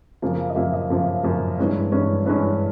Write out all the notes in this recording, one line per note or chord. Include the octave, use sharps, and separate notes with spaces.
F#2 C#3 F3 A#3
D#5
F#2 C#3 F3 A#3 E5
D#5
F#2 C#3 F3 A#3
F#2 C#3 F3 A#3
G2 E3 G#3 C#4
G2 E3 G#3 C#4
G2 E3 G#3 C#4 B4